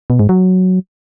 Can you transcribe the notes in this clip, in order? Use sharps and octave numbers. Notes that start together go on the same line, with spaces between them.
B2
G#2
F#3